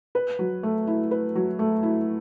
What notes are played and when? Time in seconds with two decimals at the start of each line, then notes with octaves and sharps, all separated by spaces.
0.15 B4
0.39 F#3
0.63 A3
0.87 E4
1.11 B4
1.35 F#3
1.59 A3
1.83 E4